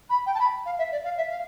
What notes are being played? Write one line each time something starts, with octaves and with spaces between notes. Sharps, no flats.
B5
G5
A5
B5
F5
E5
D5
F5
E5
F5